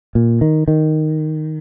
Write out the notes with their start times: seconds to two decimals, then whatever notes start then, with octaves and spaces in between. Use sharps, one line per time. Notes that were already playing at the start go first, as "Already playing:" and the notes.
0.15 A#2
0.41 D#3
0.68 D#3